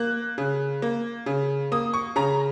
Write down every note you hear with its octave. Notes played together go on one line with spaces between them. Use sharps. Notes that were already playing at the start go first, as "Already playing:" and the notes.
Already playing: A#3 F#6
C#3
A#3
C#3
A#3 D#6
C#6
C#3 A#5